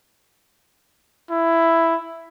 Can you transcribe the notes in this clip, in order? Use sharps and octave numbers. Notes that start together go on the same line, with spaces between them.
E4